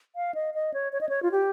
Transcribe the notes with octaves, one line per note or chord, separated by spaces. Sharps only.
F5
D#5
D#5
C#5
C#5
D#5
C#5
F4
G4